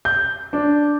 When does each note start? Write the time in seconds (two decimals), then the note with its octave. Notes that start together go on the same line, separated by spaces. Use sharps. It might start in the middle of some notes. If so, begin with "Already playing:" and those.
0.05 G6
0.53 D4